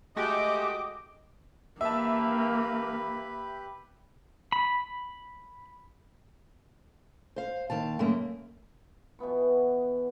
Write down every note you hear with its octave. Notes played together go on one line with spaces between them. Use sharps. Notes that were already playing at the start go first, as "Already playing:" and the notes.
G#3 A3 F#4 G4 D#5 G5 D6
A#3 G4 B4 E5 A5 B5
B5
C5 F5
D#2 D#3 F5 A5
F#2 C#3 A3 A#3
B2 E3 B3 C#6